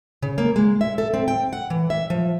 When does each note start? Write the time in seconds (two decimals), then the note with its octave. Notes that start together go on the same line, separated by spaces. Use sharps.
0.22 C#3
0.38 A#3
0.56 G#3
0.81 E5
0.98 A4
1.14 C4
1.28 G5
1.53 F#5
1.70 E3
1.90 E5
2.10 F3